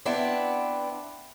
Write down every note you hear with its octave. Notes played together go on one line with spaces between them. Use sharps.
B3 C4 D4 E4